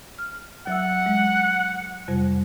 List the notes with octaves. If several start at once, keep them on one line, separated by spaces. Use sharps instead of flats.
F6
F#3 E5 F#5 E6
G#3
F2 C3 G3